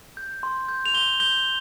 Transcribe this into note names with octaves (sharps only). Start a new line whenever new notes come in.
G6
C6
G6
F7
C6 G7
G6 G7